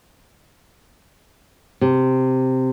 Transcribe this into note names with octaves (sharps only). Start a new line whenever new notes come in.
C3